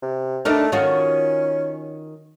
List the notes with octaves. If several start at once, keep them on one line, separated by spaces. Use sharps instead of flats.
C3
A3 D4 D#4 A#4
D#3 C#4 F4 F#4